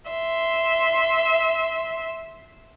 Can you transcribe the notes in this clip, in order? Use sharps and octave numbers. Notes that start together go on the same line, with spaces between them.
E5 C6